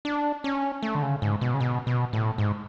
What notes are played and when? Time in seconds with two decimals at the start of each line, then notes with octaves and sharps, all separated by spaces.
0.05 D4
0.44 C#4
0.83 A3
0.95 D3
1.02 C#3
1.22 G#2
1.41 B2
1.54 C#3
1.60 B2
1.87 B2
2.13 A2
2.38 G#2